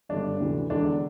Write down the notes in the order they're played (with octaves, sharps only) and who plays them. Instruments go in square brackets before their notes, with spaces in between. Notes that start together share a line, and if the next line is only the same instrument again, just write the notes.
[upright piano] G1 G2 D3 D4
D2 C3 E3
E1 E2 D3 D4